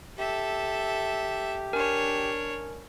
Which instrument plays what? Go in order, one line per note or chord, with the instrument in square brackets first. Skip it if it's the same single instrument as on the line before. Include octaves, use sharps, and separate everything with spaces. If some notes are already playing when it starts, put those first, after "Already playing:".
[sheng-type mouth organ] G4 [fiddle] A4 E5
[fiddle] D4 C#5 [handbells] A#4 G#5